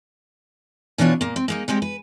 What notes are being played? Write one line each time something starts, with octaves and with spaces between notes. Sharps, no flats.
B2 E3 D4 F4 C#5
A#2 A#3
C4
G#3 A#3 D#4
G3 G#3 C4 G4
B4